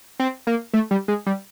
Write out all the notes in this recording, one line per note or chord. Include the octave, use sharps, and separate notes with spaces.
C4
A#3
A3
G3
G#3
G3